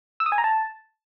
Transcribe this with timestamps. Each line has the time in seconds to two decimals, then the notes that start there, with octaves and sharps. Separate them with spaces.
0.20 E6
0.26 D#6
0.32 G#5
0.38 A#5
0.44 A5